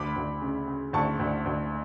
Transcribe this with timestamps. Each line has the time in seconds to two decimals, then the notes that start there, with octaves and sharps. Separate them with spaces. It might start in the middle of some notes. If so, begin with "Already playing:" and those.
Already playing: D2 B5 D6
0.16 D2
0.42 C#3
0.68 C#3
0.93 D2 A5 C#6
1.19 D2
1.46 D2